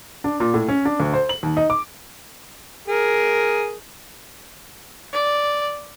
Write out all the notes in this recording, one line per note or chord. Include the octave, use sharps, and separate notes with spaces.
D4
A#2
A2
C#4
D4
D2
C5
F#7
D#2
D#4
D6
G#4 A#4
D5